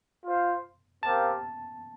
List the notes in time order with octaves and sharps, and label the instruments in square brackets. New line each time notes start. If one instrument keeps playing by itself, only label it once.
[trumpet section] F4 C5 F5
[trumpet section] C4 G4 A#4 F5 [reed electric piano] A5